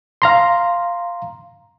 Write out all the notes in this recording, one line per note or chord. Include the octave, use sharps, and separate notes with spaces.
F5 A#5 C6